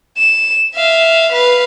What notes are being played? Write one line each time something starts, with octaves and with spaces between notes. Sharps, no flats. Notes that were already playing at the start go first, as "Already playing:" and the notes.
E7
E5 F5
B4 F5